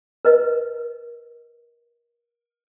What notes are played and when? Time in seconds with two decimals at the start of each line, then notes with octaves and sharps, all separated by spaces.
0.25 A#4 B4 D#5